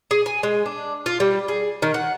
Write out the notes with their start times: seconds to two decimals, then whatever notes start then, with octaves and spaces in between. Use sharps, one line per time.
0.11 G#4
0.26 G#5
0.43 G#3
0.66 D4
1.06 F4
1.20 G3
1.48 G#4
1.82 D#3
1.94 F#5